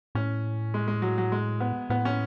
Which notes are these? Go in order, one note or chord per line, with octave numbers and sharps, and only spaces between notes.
A2 C#4
G#3
G#3
F#3
F#3
G#3
B3
A2 B3
C#4